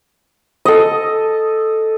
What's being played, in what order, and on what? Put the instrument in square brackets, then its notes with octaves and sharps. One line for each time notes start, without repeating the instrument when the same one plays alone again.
[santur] A4 D#5